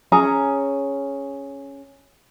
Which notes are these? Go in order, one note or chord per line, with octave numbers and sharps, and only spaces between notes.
C#4 G#4 A#5